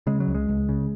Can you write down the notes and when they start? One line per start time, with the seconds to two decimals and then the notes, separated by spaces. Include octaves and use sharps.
0.07 C#3 G#3
0.20 F#3
0.28 C#2
0.34 G#3
0.49 C#2
0.69 C#3